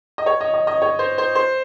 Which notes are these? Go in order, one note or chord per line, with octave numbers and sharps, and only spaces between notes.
D#5
C#5
D#5
D#5
D#5
C#5
C5
C5
C5